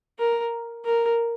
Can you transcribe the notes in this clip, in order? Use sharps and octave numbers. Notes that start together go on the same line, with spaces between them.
A#4
A#4